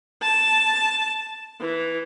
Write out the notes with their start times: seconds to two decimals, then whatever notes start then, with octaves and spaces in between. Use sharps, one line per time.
0.22 A5
1.60 E3